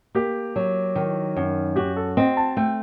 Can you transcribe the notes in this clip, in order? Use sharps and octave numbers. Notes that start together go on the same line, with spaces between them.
A#3 G4
F#3
D#3
F#2
F#4 G4
A4
C4 D#5
A5
A3 G5